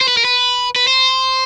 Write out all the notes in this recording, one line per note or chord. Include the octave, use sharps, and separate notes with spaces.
C5
B4
A#4
B4
B4
C5